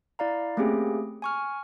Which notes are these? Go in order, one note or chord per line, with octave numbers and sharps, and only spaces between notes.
E4 D5 F5 A#5
A3 A#3 C4 C#4 G4 G#4
G#5 C#6 F6